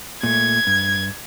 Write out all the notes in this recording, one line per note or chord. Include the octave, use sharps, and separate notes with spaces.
A#2 A3 G#6
G2